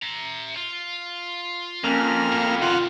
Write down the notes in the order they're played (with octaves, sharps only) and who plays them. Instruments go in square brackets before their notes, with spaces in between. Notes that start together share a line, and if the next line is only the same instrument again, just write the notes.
[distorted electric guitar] E5 A#5
F4
[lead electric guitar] F2 [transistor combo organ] A#3 F6 [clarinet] C#4
[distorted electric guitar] A2
[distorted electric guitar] C3 D#3 [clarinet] F4 [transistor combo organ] F5 F#5